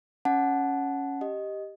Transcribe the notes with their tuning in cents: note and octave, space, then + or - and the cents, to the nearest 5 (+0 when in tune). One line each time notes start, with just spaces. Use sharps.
C#4 +0 F#5 +0 A5 -20
G4 +0 D#5 +0